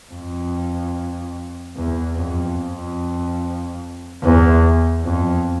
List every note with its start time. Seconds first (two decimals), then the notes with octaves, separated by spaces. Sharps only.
0.11 F2
1.76 E2
2.17 F2
2.58 F2
4.23 E2
5.05 F2